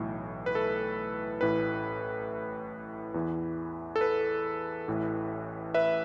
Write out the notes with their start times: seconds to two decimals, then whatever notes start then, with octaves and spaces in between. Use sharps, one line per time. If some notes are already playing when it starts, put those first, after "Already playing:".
Already playing: B1 A2 E3
0.46 B4
0.55 A4
1.41 A1 A2 E3 B4
3.14 E2 E3
3.96 A4
4.01 B4
4.88 A1 A2 E3
5.74 B4 E5